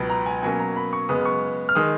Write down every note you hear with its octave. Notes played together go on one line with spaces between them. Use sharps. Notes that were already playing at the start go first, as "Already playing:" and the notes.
Already playing: C#2 B2 F#3 B3
A#5
G#5
B2 F#3 A#3 C#4 G#5
A#5
B5
C#6
F#2 C#3 G#3 B3 D#6
C#6
F6
D#3 G#3 D#6